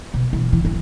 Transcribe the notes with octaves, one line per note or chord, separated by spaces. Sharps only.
B2
E3
E3
E3